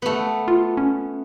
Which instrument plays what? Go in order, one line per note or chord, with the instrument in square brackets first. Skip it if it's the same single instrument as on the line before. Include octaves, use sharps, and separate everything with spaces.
[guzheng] A3 B3
[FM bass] F4
C#4